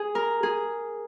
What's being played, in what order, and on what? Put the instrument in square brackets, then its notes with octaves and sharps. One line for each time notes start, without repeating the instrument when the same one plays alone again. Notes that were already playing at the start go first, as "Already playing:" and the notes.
Already playing: [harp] G#4
A#4
G#4